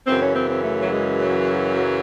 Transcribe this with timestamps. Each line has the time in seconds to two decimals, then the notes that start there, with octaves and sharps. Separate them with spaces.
0.07 F#2 C#3 E3 C4
0.21 C#4
0.36 C4
0.50 C4
0.63 A3
0.81 F#3
0.92 G#3
1.21 F#3